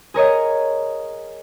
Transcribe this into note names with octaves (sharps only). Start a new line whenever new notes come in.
G#4 A#4 C#5 D#5